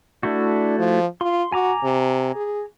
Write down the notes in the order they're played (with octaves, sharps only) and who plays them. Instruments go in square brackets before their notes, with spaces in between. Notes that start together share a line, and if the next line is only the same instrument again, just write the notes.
[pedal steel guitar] A3 E4 F#4 [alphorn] D4
[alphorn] F3
[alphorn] F4 [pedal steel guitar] C6
[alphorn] F#4 [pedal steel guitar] G#5 A#5 D6
[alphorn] C3
G#4